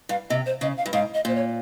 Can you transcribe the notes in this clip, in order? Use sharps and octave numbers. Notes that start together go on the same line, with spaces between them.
G2 F5
C3 D#5
C5
C#3 D#5
F5
G2
G#2 F5
D#5
A#2 C5
C#5